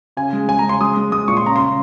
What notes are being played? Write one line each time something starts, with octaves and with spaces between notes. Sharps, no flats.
C#3 G#5
G#3
G#3 G#5
A#5
C#3
C6
G#3 D#6
G#3
G#3 D#6
A#2 C#6
C6
C#3 A#5
C#3 C6